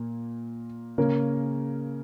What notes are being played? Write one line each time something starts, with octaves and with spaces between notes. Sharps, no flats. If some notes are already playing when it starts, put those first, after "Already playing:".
Already playing: A#2 A#3
C#3 A#3 C#4 A#4